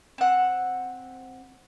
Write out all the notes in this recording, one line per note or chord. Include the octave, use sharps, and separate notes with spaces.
C4 F#5